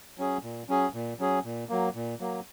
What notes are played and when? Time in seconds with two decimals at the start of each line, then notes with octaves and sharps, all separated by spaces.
0.18 F#3 C#4 G#4
0.43 A#2
0.68 F#3 C#4 G#4
0.93 A#2
1.19 F#3 C#4 G#4
1.44 A#2
1.69 F#3 A#3
1.94 A#2
2.20 F#3 A#3